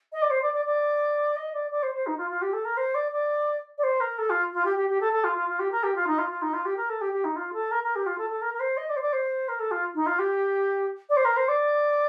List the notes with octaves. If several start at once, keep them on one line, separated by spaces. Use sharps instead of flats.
D#5
D5
C5
D5
D5
D5
D#5
D5
D5
C5
C5
D#4
F4
F4
G4
A4
A#4
C5
D5
D5
D5
C5
A#4
A4
F4
F4
G4
G4
G4
A4
A4
F4
F4
F4
G4
A#4
G4
F4
D#4
F4
F4
D#4
F4
G4
A#4
A4
G4
G4
D#4
F4
A4
A#4
A#4
G4
F4
A4
A4
A#4
A#4
C5
D#5
D5
C5
D5
C5
A#4
A4
F4
D#4
F4
G4
D5
C5
A#4
C5
D5